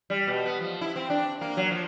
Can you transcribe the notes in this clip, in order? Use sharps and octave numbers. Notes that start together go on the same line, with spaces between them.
G3
B2
B3
F3
E4
C4
D4
A#3
F#3
F3